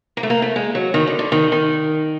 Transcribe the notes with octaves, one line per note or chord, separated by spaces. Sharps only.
A#3
A3
A#3
A3
G#3
F#3
D#3
D3
D3
D#3
D#3